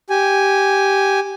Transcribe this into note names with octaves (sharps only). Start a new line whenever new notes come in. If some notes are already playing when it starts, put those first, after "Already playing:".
G4 G#5